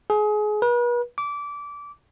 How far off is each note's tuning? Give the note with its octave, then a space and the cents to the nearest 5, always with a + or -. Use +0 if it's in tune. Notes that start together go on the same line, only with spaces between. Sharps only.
G#4 +25
B4 -40
D6 -20